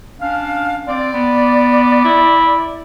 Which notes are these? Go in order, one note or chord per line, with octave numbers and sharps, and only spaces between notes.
C#4 D4 F5
C4 D5
B3
E4